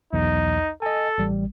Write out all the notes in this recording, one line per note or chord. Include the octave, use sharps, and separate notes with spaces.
B1 E2 D#4
A4 D#5 G#5
A1 G3